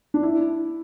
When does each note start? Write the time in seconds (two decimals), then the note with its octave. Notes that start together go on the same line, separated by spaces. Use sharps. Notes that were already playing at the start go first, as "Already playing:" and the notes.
0.14 D4
0.23 E4